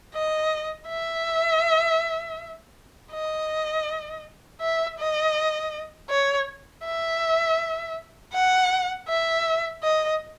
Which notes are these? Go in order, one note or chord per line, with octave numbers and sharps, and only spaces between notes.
D#5
E5
D#5
E5
D#5
C#5
E5
F#5
E5
D#5